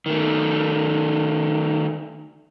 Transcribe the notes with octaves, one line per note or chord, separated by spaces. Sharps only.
D#3 A3